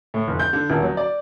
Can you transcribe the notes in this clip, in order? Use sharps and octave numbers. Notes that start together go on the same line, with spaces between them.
A2
F1
G6
D3
D#1
F#3
D5